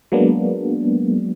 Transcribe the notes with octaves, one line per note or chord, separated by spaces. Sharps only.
F#3 G#3 A#3 B3 D4